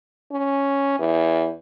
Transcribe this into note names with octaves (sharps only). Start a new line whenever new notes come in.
C#4
E2